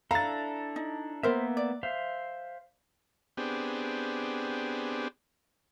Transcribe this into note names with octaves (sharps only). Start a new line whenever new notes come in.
D4 E4 A4 F5 A#5 A6
D#4
A#3 B3 A#4 C5 E5
D5
C5 E5 F5
B3 C4 D4 G4 G#4